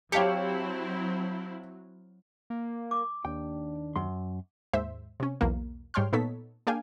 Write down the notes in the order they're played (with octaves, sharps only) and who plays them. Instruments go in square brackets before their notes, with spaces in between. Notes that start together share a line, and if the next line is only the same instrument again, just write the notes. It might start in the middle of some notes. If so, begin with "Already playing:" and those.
[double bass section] F#3 [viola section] C4 E4 [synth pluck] G4 C#5 [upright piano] F5 A5 C#7
[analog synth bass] A#3
[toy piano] D6
[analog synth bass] D#2 [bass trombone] D4 [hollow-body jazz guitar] G5
[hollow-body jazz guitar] F#2 C6
[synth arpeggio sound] D#2 G#2 C5 E5
C3 C#4
B1 E2 A#3
G#2 G3 C#5 G5 C6 F6
A#2 B3 D#4 A4 C#5 B6
A#3 D4 G#4 F5 G5 G#5